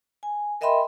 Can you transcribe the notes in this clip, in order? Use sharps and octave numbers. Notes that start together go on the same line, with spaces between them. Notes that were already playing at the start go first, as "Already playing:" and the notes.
G#5
A#4 D#5 E5 G5 B5 C6